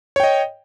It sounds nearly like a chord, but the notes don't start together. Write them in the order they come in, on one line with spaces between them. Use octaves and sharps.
C#5 G5 D#5